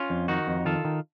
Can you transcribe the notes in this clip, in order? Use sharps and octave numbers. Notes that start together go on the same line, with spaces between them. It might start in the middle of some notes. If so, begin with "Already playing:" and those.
Already playing: C#4 F4
F2
D#3 D#4 F#4
F2
D#3 F4 A4
D#3